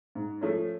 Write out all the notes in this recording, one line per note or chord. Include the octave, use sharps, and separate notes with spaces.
G#2
F3 A3 C#4